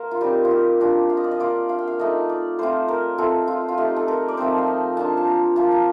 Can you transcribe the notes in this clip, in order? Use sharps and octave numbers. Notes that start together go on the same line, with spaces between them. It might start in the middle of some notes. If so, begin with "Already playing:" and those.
Already playing: A#3 A#4 C5
F4
G3 C4 D#4 G4
F4
G4
A#3 D4 F4 G4
F5
D#5
D5
D#5
A#3 F4 D5
F5
G5
F5
A3 D#4 D#5
D5
A3 C4 F4 C5
A#4
A3 C4 F4 A4
F4
F4
A3 D#4 G4
A4
A#4
D5
F3 A3 C4 D#4 C5
F5
D#5
A#3 D4 F4 A5
A5
A#5
A#3 F4 A5
A#5